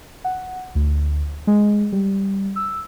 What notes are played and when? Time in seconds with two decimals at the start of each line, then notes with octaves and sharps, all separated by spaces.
0.24 F#5
0.75 D2
1.47 G#3
1.92 G3
2.56 E6